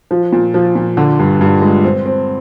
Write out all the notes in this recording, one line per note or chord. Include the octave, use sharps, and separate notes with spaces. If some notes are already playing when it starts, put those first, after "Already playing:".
F3
A#2
F3
A#2
D3
G2
G2
G#3
C4
C4